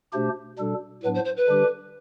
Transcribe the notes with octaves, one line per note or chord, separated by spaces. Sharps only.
B2 A3 D4 G4 C5
B2 G3 D4 A4
A2 F#3 B3 D4 B4
C5
C5
B4
D3 G3 D4 G4